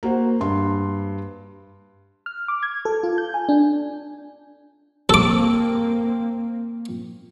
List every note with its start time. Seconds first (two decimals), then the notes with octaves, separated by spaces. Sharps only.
0.03 A#3 F#4 C5
0.41 G2 C6
2.26 F6
2.48 D6
2.63 G#6
2.85 A4
3.03 F4
3.18 G6
3.34 G#5
3.49 D4
5.09 A#3 C4 A4 D6